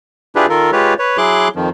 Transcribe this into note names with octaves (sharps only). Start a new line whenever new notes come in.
D4 E4 F4 G4 G#4 B4
D#3 F4 A4 A#4
G#3 F4 G4 B4 C#5
B4 C#5
F#3 E4 G#4 C6 D6 F#6
F2 D#3 F3